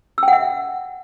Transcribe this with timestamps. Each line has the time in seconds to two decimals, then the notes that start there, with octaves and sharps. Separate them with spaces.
0.18 E6
0.23 G5
0.28 F#5
0.33 E5